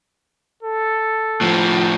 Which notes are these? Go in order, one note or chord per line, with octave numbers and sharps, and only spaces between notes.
A4
A2 F3